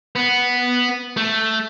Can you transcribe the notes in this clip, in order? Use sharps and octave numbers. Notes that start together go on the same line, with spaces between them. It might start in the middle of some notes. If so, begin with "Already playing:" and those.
B3
A3